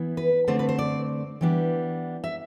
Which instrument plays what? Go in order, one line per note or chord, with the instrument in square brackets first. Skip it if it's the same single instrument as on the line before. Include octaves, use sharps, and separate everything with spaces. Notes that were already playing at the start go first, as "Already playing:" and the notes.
Already playing: [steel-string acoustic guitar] E3 B3 E4
B4
D3 A3 C4 C5
B4
C5
D5
E3 G3 B3 D4
E5